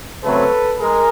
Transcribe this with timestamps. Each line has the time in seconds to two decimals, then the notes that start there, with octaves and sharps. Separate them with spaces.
0.23 C#3 F#3 A3 C4 A4 B4
0.80 G#3 G#4 A#4